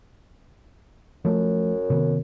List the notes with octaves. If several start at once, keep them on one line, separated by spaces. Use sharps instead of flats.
F#2 F3 A3
C3 D#3 B3